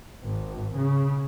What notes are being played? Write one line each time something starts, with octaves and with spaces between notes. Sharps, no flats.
G#1
C#3